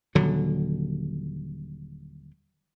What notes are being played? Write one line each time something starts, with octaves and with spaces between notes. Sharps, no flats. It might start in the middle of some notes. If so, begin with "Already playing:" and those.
D#1 D3 F#3